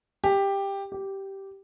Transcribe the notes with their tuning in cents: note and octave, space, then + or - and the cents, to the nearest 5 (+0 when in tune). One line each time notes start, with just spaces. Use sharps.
G4 +10
G4 -10